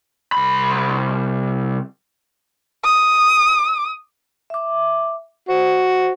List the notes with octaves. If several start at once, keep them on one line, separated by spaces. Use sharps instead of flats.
C2 B5
D#6
E5 D6
F#4 C5